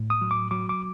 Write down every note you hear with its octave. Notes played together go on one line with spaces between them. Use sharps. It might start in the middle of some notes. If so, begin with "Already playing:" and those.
Already playing: A2
D#6
F#3
D6
F#3 D6
D6